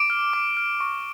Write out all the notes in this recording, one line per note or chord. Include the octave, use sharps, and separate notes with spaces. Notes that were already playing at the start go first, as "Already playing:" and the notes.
Already playing: D6 D7
F6
D6
F6
C#6